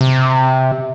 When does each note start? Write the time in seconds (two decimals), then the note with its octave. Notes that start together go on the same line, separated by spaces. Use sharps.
0.01 C3